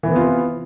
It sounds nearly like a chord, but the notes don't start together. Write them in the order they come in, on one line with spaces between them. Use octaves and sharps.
E3 C3 B3 F4